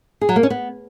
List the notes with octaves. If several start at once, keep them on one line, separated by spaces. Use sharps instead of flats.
G#4
F#3
A#3
C#4
B3